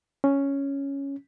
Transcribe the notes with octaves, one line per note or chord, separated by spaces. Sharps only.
C#4